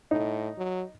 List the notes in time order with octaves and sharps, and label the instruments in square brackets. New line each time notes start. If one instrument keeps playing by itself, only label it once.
[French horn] A2 [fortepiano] D#4
[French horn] F#3